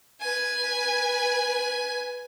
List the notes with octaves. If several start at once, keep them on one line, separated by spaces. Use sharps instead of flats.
B4 G#5